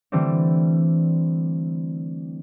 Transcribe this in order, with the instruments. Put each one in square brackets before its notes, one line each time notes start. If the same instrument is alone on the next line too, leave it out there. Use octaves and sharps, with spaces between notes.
[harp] D3 E3 G3 A3 C4 D4